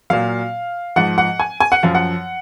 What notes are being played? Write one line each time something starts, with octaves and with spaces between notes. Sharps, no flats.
A#2 F#3 F5
G#2 F3 F#5
F#5
G#5
G#5
F#5
F#2 F3 F5
F#5